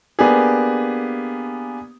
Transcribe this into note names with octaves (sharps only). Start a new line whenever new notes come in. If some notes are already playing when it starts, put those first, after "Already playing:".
A#3 B3 D4 G4 G#4